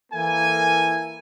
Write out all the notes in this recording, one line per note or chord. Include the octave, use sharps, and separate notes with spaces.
E3 A#3 E4 A4 G#5